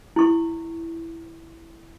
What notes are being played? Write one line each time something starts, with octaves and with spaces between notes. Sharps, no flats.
E4 C#6